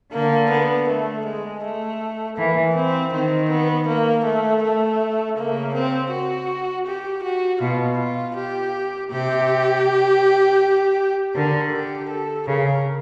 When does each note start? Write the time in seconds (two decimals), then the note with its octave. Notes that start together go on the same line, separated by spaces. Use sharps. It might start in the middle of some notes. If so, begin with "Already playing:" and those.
0.13 D3 A#3
0.51 B3
0.89 A3
1.26 G#3
1.63 A3
2.37 E3 A#3
2.75 C4
3.12 D#3 C4
3.50 B3
3.87 A#3
4.25 A3
4.63 A3
5.37 C#3 A#3
5.75 C4
6.11 F#4
6.87 G4
7.24 F#4
7.61 B2 F4
7.98 F4
8.37 G4
9.11 C3 G4
11.35 D3 A#4
11.73 G4
12.10 A4
12.47 C#3 A#4